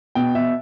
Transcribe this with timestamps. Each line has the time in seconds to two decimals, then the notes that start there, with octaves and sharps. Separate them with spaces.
0.15 B2 G5
0.35 B2 E5